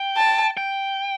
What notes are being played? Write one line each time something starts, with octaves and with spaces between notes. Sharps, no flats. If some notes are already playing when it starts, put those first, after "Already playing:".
Already playing: G5
A5
G5